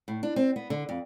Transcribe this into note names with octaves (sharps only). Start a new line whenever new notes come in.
A2
D4
C4
B3
D3
F2